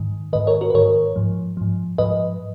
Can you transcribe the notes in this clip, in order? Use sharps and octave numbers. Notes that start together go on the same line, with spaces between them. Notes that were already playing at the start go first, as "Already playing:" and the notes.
Already playing: G#2 D#3
G#2 D#3 B4 D#5
A#4 C#5
F#4 A#4
B4
G#2 D#3 A#4 C#5
G#2 F3
G#2 F3
G#2 F3 B4 D#5